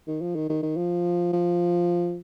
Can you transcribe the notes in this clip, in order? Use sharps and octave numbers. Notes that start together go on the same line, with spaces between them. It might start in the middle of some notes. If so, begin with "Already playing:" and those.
D#3
F3
D#3
D#3
D#3
F3
F3